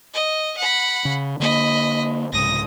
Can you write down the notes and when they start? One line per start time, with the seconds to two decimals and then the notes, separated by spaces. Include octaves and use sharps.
0.14 D#5
0.57 F#5 B5
1.05 C#3
1.40 D3 A#3 D#5 B5
2.32 C2 G#2 C#3 D#6 A#6